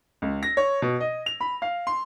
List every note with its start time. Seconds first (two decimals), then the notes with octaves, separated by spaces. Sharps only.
0.22 C#2
0.43 A#6
0.57 C#5
0.82 B2
1.00 D#5
1.26 F7
1.41 B5
1.62 F5
1.87 C6